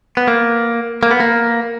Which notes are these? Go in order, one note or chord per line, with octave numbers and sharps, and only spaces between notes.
B3
A#3
A#3
B3
A#3